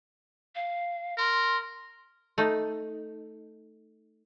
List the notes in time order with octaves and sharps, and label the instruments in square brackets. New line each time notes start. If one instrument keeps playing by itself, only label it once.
[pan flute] F5
[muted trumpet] A#4 [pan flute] C6
[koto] A3 D#4